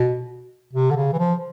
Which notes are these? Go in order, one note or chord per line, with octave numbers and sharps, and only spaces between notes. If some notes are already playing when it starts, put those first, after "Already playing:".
Already playing: B2
C3
D3
C#3
E3
F3